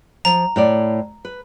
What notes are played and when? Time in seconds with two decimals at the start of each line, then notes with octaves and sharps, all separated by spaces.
0.25 F3 A#5
0.56 A2 C#5 D5
1.25 B4